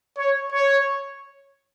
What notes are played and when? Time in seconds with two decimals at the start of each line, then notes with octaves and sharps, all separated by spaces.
0.18 C#5
0.52 C#5